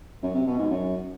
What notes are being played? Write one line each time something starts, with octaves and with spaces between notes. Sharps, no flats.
F#2
C3
B2
G#2
F#2